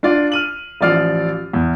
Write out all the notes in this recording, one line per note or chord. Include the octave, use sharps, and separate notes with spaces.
D4 F4 D5
F6 D#7 F#7
A1 F3 D5 F6 C7
E2